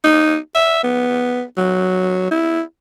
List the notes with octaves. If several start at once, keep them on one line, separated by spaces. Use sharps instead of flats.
D#4
E5
B3
F#3
E4